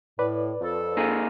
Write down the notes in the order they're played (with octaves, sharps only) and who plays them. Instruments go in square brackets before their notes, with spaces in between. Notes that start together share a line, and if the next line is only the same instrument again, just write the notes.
[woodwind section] A2 [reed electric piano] B4 D5
[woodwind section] F2 A4
[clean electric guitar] A#3 D#4 G#4